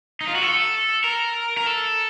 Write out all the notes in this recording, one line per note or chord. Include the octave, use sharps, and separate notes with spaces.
D#4
F4
F#4
A4
A#4
A#4
A4